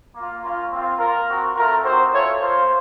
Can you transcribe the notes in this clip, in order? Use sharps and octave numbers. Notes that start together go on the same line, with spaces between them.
A#3 F4
A#3 C#4 F4
C4 F4
A#3 F4 A#4
C4 F#4
A3 C4 F4 A#4
C4 D#4 F#4 C5
A3 C#4 F4 C#5
A#3 F4 C5